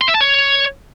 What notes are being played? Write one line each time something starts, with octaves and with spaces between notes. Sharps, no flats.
C6
E5
A5
C#5